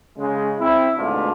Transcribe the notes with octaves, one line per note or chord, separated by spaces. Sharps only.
C#3 G#3
C4 E4
D2 G#2 B2 D4 F4